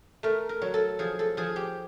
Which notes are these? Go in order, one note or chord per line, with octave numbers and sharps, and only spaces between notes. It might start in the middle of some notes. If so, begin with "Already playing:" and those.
A3 A#4
A#4
F#3
A4
F3 G#4
A4
F3 G#4
G4